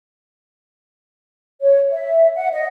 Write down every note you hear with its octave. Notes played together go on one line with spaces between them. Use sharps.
C#5
E5
F#5
D#5